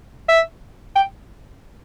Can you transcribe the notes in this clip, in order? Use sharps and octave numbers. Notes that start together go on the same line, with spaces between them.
E5
G5